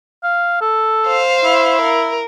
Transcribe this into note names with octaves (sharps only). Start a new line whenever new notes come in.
F5
A4
C5 F5
E4
A#4